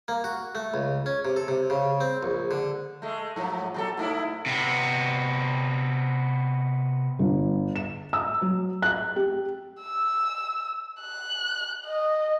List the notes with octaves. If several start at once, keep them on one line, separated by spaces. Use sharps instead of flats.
A#3
F#4
A3
C#2
C#4
C3
A4
C3
C#3
C4
A#1
D3
G#3 A3
G#2 F3 F#3
A#2 F#3 A4
G#2 A3 E4
C3 B3
G1
E7
E6
F#3
F#6
G4
E6
F#6
D#5